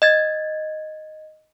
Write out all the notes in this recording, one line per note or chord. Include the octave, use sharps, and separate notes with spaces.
D#5 G#6 A6